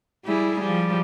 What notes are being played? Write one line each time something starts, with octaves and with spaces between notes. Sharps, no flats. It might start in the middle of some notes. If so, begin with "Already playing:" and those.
G3 E4 G#4
F3 G3